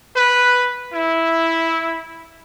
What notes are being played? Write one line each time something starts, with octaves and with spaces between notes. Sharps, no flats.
B4
E4